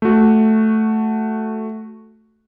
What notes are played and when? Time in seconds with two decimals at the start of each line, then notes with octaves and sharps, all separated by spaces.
0.02 A3 F#4